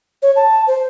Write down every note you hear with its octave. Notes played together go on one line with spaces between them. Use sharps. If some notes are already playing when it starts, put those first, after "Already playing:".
C#5
A5
C5